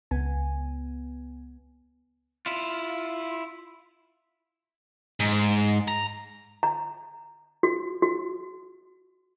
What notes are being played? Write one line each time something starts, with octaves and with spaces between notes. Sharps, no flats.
C#2 B3 G#5
E4 F4
G#2
A#5
A#5
F#4
F#4